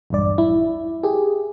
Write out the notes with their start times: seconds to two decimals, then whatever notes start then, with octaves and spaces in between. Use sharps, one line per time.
0.10 A#1 E2 G2 D5
0.38 E4
1.03 G4 G#4